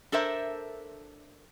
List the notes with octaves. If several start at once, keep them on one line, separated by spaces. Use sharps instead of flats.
D4 A4 A#4 C5 E5